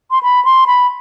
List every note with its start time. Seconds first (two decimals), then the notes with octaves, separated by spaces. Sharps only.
0.11 C6
0.23 B5
0.45 C6
0.67 B5